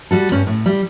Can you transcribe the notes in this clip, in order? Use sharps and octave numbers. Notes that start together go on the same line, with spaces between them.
G3 F#4 A4
G2 C#4
A2
G3